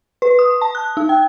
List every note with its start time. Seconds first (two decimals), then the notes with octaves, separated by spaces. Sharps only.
0.22 B4
0.39 D#6
0.61 A5
0.75 F#6
0.97 D#4
1.09 G5